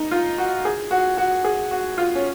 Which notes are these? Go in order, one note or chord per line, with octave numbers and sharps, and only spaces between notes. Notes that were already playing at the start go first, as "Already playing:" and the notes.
Already playing: D#4
F4
F#4
G#4
F#4
F#4
G#4
F#4
F4
C#4